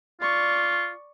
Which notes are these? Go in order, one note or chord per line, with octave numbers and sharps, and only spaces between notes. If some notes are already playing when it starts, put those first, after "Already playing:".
F4 D5 C#6